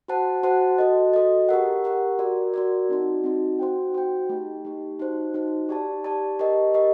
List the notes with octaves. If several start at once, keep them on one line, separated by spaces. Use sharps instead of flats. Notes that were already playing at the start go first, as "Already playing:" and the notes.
F#4 C5 F#5 A5
F#4 C5 F#5 A5
F#4 A4 D#5
F#4 A4 D#5
G4 A#4 F#5
G4 A#4 F#5
F#4 A#4 D5
F#4 A#4 D5
C4 D#4 F#4
C4 D#4 F#4
F#4 C5 G5
F#4 C5 G5
A3 D#4 G4
A3 D#4 G4
D#4 F#4 C5
D#4 F#4 C5
G4 D5 A5
G4 D5 A5
G4 A#4 D#5
G4 A#4 D#5